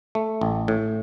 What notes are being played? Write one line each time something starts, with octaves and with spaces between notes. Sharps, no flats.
A3
A1
A2